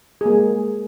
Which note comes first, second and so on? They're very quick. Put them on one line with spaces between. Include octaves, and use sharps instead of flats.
G#4 A#3 G#3